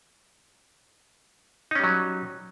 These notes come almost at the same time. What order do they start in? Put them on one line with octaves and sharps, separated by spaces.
D#4 C#4 G3 F#3